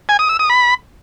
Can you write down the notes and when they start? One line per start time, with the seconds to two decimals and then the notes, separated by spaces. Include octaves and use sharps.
0.09 G#5
0.19 D#6
0.29 E6
0.39 D#6
0.50 B5